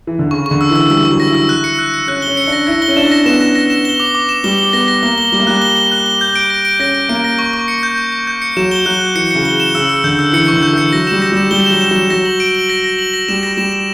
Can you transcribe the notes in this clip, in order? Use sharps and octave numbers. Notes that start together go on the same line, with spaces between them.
E3
D3
C#3 C#6
D3 C#6
E6
E3
E6
G3 E6
E3
F#3 C#6
A#6
E4 E6
F#6
C#7
F#6
C#7
C#4 F#6
G7
C#4
C#7
D4
A#6
E4 A#6
G7
C#4
D4 E7
A#6
B3 E7
A#6
A#6
E7
G7
D6
D6
E7
G3 G7
G7
B3 A#6
A#6
A#3 G7
G7
G3 G7
A#3
G3 F#6
G7
G7
F#6
G7
G6
D7
A#6
D7
C#4 A#6
D7
A#3 D7
A#6
C#6
C#6
C#7
G6
C#6
C#6
G6
C#7
F#3 E7
G7
F#3 F#6
F#6
E3 C#7
C#3 C#7
G7
E7
C#3 E6
E6
D3 G6
E6
E3 C#7
C#6
D3
G6
E3 C#7
F#3 A#6
G3 E7
A#6
G3 E7
G3 G7
F#3 E7
E7
F#3 E7
F#3 A#6
F#7
D7
F#7
A#6
A#6
F#7
A#6
G3 E7
A#6
G3 E7
E7